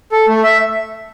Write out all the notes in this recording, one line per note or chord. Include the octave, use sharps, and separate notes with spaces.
A4
A3
E5